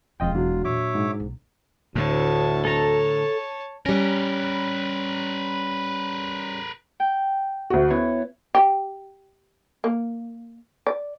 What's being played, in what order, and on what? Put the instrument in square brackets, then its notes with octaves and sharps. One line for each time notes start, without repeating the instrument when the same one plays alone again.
[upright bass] E1 G#3 [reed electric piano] F2 D#5 G5 [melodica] F4
[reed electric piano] E2 [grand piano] F#3 D4
[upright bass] A#2 [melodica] C#5 E5 D6
[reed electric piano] G#2
[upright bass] B1
[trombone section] D2 [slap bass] A2 D3 [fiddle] C#5 A5
[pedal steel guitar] A4 A#5 [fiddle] C#5 A5
[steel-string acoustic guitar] G3 C#4 [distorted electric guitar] A#4 B4
[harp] G5
[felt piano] D2 F#4
[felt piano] B3 E4 [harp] C#5
[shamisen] G4
A#3
D5